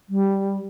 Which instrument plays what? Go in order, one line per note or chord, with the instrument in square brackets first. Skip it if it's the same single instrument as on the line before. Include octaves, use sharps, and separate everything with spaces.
[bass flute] G3